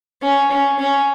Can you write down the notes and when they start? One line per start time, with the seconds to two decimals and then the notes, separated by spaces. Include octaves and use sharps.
0.22 C#4
0.51 C#4
0.79 C#4